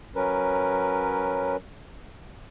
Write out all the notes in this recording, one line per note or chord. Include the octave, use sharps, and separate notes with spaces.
F#3 C#4 A#4 B4